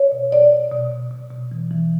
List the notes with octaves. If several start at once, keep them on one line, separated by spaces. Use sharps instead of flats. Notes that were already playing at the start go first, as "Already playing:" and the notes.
Already playing: C#5
B2
B2 D5
B2
B2
B2
B2
B2
E3
E3